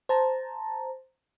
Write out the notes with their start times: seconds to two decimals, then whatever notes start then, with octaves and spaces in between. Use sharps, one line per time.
0.09 C5 A5 A#5